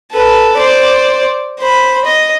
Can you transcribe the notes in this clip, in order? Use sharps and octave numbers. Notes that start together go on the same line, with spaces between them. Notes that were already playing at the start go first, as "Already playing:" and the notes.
A4 B4
C5 D5
C5 B5
D#5